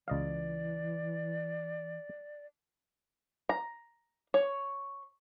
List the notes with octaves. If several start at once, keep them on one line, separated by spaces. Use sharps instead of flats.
C#2 E3 D5 D#5 F5
A#5
C#5